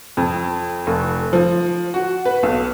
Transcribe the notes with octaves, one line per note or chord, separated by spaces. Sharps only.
F2
F1
F3
F#4
B4
B1